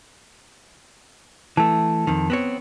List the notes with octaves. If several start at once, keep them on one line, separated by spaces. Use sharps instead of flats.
E3 A3 A5
F2 D#3
B3 C4 C#5